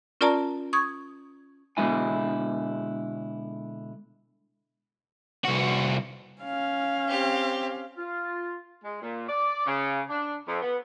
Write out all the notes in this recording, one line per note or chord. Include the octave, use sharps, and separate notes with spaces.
C#4 F4 A#4 D5 A5 A#5
C#6 D#6 G#6
B2 D3 G#3 E4 G#5
C2 F#4
C#4 F5
C4 G4
F4
G#3
A#2
D5
C#3
D4
F2
B3